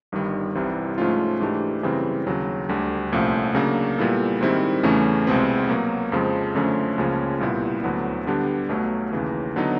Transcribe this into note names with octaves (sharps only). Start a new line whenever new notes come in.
G1 G2 D#3 G3
C2 C3 E3 G3
G#2 F3 A3 C#4 F4
G#2 E3 A3 D4 G4
F#2 C#3 E3 G3 C4
D#2 C#3 F#3
D2 D3 G3
C2 A#2 F3 A3 C#4
C#3 F#3 A#3 D4
A#2 G3 B3 E4 A4
G#2 D#3 G3 C4 E4
E2 C#3 E3 A3 C#4
C2 B2 G#3 C4
B2 F#3 A#3
F2 C#3 F3 G#3 C4
F#2 D3 F3 A3 C#4
C#2 C#3 F3 A#3 C#4
C2 A#2 G3 B3 E4
D2 D3 F#3 B3 E4
D3 G3 B3 D4 G4
B1 B2 F#3 A3
D#2 C#3 E3
D3 F#3 B3 D#4